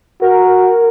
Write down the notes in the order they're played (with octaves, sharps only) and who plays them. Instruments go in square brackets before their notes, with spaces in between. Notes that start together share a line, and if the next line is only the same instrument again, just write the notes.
[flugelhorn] F#4 [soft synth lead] A#4